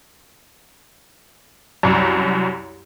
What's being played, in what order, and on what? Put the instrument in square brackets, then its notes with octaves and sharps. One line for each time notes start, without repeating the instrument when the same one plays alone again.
[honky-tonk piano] C2 F#2